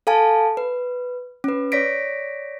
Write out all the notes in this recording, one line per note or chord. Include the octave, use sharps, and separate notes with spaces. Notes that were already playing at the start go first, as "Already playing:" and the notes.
A4 F5 G#5 A5
B4
C#4 B4
C#5 D5 A#6 B6 D7